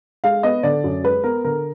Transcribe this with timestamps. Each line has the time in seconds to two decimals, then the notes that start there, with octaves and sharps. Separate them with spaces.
0.24 G#3 F5
0.43 B3 D#5
0.63 D3 D5
0.84 F#2
1.04 G#3 B4
1.24 B3 A#4
1.44 D3 A#4